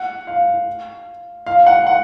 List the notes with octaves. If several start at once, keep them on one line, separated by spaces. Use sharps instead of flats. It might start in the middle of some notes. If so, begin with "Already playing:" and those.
Already playing: F#5
F5
F5
F#5
F#5